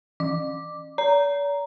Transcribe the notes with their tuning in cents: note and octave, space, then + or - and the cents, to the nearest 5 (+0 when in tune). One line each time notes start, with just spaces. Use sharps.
E3 +0 D6 +0
D5 -45 A#5 +0